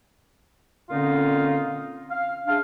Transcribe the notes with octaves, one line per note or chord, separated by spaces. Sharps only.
A#2 D3 C4 C#4 D#4 F4
F5
C#3 D4 E5 F5